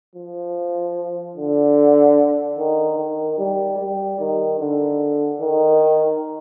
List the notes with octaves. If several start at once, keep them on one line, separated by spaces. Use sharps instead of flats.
F3
D3
D#3
D#3
G3
G3
D#3
D3
D#3